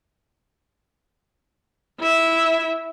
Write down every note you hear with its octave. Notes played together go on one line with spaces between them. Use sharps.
E4 E5